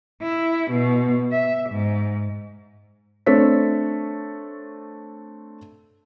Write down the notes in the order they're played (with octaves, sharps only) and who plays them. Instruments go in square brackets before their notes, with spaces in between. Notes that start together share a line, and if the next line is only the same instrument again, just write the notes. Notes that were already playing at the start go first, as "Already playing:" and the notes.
[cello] E4
B2
E5
G#2
[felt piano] A3 C4 D4 A4 C#5 B6